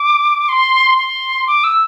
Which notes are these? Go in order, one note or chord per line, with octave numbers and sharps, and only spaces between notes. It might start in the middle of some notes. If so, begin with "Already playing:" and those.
Already playing: D6
C6
C6
D6
E6